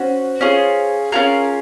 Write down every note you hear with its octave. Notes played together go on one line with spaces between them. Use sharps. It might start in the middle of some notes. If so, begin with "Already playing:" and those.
Already playing: C#4 F#4 C5
C#4 F4 G#4
C#4 F4 G#4 A#4